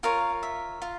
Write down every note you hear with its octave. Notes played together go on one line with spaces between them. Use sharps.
F4 A#4 C#5 F5
E5
F4